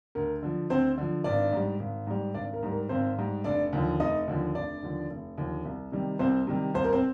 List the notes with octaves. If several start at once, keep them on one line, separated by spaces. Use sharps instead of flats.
D2 A#4
D3 F3
D2 C4 C5
D3 F3
G#1 D4 D5
G#2 G3
G#1
G#2 G3
G#1 D4 D5
A#4
G#2 G3
A#4
G#1 C4 C5
G#2 G3
F1 D4 D5
D#2 D3 F3
F1 D#4 D#5
D#2 D3 F3
F1 D4 D5
D#2 D3 F3
F1
D#2 D3 F3
C2
C3 D#3 G3
C2 C4 C5
C3 D#3 G3
C2 C5
A#4
C4 C5